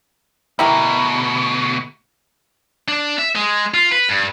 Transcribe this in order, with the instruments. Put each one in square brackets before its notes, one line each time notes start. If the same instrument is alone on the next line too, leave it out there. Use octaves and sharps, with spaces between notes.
[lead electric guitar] D2 B2 [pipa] E4 G4 A#4
[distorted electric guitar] D4
E5
G#3
F4
B4
G2